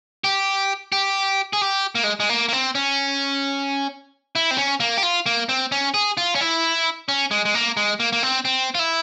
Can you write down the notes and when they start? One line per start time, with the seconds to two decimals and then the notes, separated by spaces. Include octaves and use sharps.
0.24 G4
0.92 G4
1.53 G#4
1.61 G4
1.95 A#3
2.04 G#3
2.20 G#3
2.29 A#3
2.49 A#3
2.53 C4
2.75 C#4
4.35 E4
4.51 C4
4.58 C#4
4.80 A#3
4.97 G4
5.03 F4
5.26 A#3
5.49 C4
5.72 C#4
5.94 G#4
6.17 F4
6.35 C#4
6.41 E4
7.08 C#4
7.31 G#3
7.45 G#3
7.55 A#3
7.77 G#3
8.00 A#3
8.13 A#3
8.23 C4
8.45 C4
8.75 F4
8.79 E4